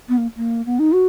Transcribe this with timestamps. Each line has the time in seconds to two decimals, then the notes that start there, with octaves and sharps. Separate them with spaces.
0.09 B3
0.18 A#3
0.36 A#3
0.66 B3
0.79 D#4
0.94 F#4